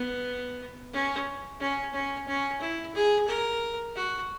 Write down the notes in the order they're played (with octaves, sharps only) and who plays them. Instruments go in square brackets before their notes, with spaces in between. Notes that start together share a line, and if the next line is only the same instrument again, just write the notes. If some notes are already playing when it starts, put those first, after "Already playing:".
Already playing: [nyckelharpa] B3
C#4
C#4
C#4
C#4
E4
G#4
A#4
F#4